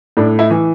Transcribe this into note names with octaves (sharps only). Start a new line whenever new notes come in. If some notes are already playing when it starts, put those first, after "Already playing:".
A2 D4
E4
E3